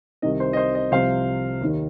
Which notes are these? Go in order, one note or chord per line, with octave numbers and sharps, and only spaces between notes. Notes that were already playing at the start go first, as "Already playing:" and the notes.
C2 C3 D#3 D#5
C5
D#5
C5
D#5
C2 C3 F3 C5 F5
D#2 D#3